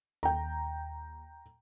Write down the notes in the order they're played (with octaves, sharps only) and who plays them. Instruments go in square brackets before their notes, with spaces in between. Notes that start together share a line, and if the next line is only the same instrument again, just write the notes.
[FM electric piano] D#2 [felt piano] G5 A#5